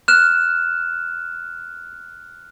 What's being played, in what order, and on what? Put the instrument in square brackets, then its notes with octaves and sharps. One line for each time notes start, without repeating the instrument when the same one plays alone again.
[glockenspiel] F6 F#6 E7